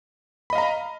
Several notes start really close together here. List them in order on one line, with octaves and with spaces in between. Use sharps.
B5 D#5 F5 A#5